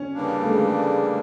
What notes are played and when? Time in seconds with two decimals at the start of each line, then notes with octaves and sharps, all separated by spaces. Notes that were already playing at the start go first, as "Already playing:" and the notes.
Already playing: C#4
0.15 C#3 E3 G3 A#3 D4
0.42 A3
0.48 G#3